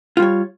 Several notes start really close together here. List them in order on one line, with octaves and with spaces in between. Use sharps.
F4 G3 C#5